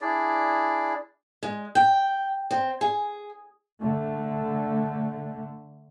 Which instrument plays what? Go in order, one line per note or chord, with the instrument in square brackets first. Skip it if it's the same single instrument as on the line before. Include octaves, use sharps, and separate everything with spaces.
[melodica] D4 E4 G#4 D5
[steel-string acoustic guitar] G#3
G5
C4
G#4
[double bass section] D3 A3